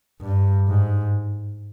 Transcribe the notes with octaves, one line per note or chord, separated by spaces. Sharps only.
G2
G#2